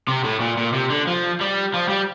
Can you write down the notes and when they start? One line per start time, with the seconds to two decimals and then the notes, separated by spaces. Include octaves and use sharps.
0.08 C3
0.24 A2
0.41 A#2
0.57 A#2
0.74 C3
0.90 D3
1.07 F3
1.41 G3
1.74 F3
1.89 G3